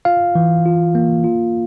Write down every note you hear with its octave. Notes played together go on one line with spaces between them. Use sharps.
F4 F5
E3
F4
A#3
F4